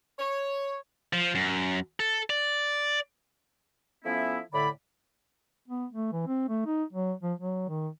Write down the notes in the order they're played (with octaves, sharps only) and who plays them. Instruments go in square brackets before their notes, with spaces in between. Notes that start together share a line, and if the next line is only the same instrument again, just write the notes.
[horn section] C#5
[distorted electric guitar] F3
F#2
A4
D5
[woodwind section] F3 A3 B3 C#4 E4
A2 D3 D5 B5
[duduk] B3
A3
E3
C4
A3
D#4
F#3
F3
F#3
D#3